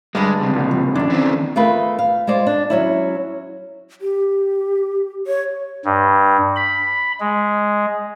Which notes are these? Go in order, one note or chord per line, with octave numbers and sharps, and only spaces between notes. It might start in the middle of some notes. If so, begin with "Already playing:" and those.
D2 G2 G3 G#3 B5
C#2 C3
A#1
F3
F#2 D#3 C#4 D4
E3 C4
A3 F4 G#4 A#4 B4
F5
G#3 F4 C5 D5
D4
F#3 C#4 E4
G4
C#5
G2
B5
G#3